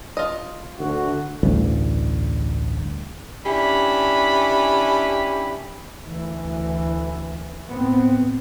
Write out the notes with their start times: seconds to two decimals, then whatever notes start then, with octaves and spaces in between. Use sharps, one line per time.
0.17 F4 D#5
0.79 D2 F#4
1.43 A1 D2 G2
3.45 C#4 D4 E4 G4 B5
6.06 D2 E3
7.68 A2 B3 C4